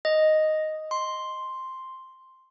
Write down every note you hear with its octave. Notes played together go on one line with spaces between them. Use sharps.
D#5
C6